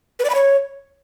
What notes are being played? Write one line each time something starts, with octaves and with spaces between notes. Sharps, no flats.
B4
D5
B5
C#5